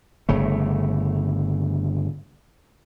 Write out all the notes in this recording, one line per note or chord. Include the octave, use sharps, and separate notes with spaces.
G1 C#3 A3